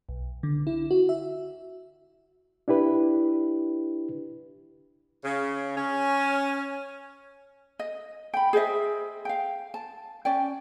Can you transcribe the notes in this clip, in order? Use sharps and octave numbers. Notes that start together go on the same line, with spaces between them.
B1
D3
E4
F#4
E5
D4 E4 G4 B4
C#3
C#4
D#5
G5 B5
G#4 C5 D#5 E5
F5 G5
A5
C#4 D5 G5